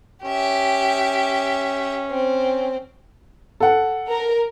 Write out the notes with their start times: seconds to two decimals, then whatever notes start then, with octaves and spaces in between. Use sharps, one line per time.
0.25 C#4 G4 E5
2.10 C4
3.60 A4 F#5
4.09 A#4